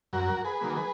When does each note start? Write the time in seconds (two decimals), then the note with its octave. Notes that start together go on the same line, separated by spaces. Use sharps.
0.13 F#2 F#4 A#4
0.45 G#4 B4
0.61 D#3 F#3 A#3
0.77 G#4 B4